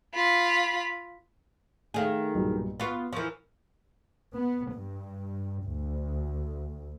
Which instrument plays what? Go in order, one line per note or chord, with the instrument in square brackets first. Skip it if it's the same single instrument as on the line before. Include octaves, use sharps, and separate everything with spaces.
[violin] F4 B5
[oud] D#3 G#4 [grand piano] A3 F5
[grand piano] B1 G2 A#2
[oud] B3 F4 [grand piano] B5 C#6
[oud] E3 F3 [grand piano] A#4 C#6
[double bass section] B3
G2
D2